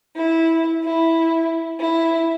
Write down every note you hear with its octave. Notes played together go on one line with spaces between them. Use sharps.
E4
E4
E4